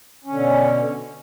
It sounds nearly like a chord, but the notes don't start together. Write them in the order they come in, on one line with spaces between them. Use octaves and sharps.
C#4 D3 B2